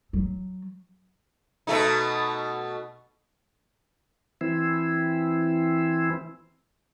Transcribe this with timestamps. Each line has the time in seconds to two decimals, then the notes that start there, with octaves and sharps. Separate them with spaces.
0.13 F#3
1.67 B2 A3 D#4
4.41 E3 C4 E4